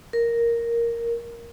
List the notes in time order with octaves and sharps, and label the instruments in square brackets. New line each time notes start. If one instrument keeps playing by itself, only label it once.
[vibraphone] A#4